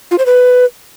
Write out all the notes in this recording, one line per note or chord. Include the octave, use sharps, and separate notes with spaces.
F4
C5
B4